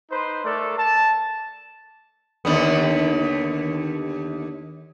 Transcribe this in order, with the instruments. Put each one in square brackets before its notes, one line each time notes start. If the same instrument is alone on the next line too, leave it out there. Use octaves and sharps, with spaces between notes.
[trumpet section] D#4 B4 C5
A3 A4 A#4 D5
A5
[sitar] D#2 D3 B3